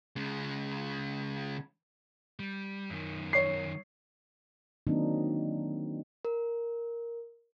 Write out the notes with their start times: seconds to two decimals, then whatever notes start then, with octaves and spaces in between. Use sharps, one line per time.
0.16 C#3 G#3
2.39 G3
2.90 F#2 D#3
3.33 C#5 C7
4.87 D#3 F#3 A#3 C4 D4 D#4
6.25 A#4